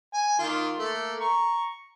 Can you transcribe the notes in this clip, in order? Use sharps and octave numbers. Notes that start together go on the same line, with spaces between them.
G#5
D#3 A#3 F4
A3 A#3
A#5 C#6